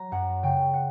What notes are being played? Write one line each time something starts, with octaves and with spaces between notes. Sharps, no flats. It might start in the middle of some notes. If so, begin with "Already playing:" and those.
Already playing: F#3 A#5
F#2 F#5
C#3 G5
F#5